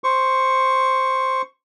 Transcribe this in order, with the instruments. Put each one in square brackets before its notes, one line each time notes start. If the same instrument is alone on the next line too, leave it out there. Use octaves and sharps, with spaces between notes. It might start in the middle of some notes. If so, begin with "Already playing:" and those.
[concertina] C5 C#6